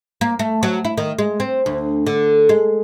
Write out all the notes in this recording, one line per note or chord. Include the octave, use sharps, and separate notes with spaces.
A#3
A3
F#3
E4
D#3
G#3
C4
D2
D3
G#3